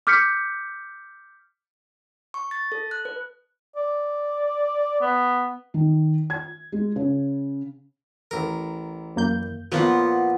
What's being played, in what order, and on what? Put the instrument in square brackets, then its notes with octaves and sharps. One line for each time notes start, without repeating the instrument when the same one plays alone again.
[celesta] D6 F6 G6 B6 C#7
[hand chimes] C#6
A6
A4
F#6
B4
[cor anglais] D5
B3
[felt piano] D#3
G#6
G#3
C#3
[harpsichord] A1 A#4
[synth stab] F#2 A#3 G6
[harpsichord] A#2 F3 [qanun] B3 F4 F#5